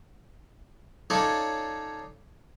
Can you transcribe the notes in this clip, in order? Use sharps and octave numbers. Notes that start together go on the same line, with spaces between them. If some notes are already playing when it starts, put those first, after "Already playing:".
C#4 D#4 F4 A4 C#5 D5